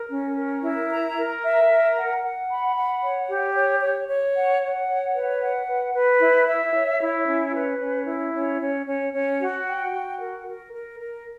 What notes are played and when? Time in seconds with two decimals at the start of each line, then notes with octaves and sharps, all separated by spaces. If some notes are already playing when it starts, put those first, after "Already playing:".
Already playing: A#4
0.09 C#4
0.36 A#4
0.62 E4
0.90 A#5
1.16 A#4
1.43 E5
1.69 A#4
1.96 F#5
2.22 F#5
2.49 B5
2.75 F#5
3.02 C#5
3.28 G4
3.55 C#5
3.81 C#5
4.08 C#5
4.35 F#5
4.61 F#5
4.88 C#5
5.15 B4
5.41 F#5
5.68 B4
5.94 B4
6.21 E4
6.48 E5
6.74 C#5
7.01 E4
7.27 C#4
7.54 B4
7.80 C#4
8.06 E4
8.34 C#4
8.60 C#4
8.87 C#4
9.13 C#4
9.40 F#4
9.66 G5
9.93 F#4
10.19 A#4
10.46 A#4
10.72 A#4
10.99 A#4